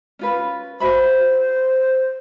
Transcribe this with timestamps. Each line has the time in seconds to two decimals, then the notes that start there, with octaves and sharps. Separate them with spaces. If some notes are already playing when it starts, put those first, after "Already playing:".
0.19 C#4 F4 B4
0.80 F#4 C5 E5 B5